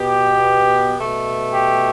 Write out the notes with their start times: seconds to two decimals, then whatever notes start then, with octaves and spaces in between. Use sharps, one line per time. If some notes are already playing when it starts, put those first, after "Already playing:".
Already playing: B2 B3 G4
0.98 B2 A3
1.54 G4